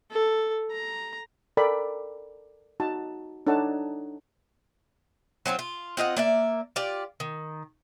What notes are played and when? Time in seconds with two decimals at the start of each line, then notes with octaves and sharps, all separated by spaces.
0.11 A4
0.71 A#5
1.57 A4 A#4 D5 G5 B5
2.80 D#4 F#4 A5
3.47 D4 D#4 A4 C#5 F#5 A5
5.46 F#3 C4 D4 F4
5.59 F4
5.97 C4 F4 D#5 F#5
6.17 A#3 D5 E5
6.76 F4 G4 D5
7.20 D#3